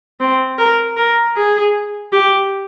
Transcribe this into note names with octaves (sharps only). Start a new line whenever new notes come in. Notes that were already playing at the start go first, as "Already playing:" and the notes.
C4
A#4
A#4
G#4
G4